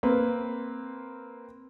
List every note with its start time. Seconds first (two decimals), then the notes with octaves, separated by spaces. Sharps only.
0.03 A#3 C4 B4